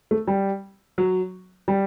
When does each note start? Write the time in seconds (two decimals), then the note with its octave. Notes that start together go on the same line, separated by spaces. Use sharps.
0.11 A3
0.28 G3
0.98 F#3
1.68 G3